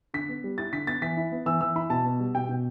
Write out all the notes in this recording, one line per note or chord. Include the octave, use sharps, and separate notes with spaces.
D3 B6
B3
G3
E4 A6
D3 B6
B3 A6
E3 B6
E4
B3
E3 E6
E3 E6
E4 B5
B2 A5
B3
G3
B2 G5
B2